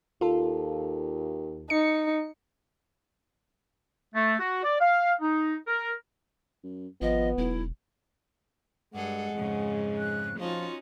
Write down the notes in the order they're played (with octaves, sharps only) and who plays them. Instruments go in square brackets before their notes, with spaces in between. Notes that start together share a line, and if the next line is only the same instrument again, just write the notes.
[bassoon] D#2 [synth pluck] F4 A4
[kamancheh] D#4 [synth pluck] C#7
[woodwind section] A3
F#4
D5
F5
D#4
A#4
[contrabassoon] F#2
[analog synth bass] G#1 [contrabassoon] F3 [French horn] B3 [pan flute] D#5
[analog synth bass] E1 [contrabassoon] B1 [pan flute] E4
[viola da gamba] G2 G#4 A4 [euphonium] G#3 [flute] F#5
[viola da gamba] F2 G#2 C#3
[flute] F#6
[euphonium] F3 [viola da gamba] C#4 D#4 F#4 [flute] F4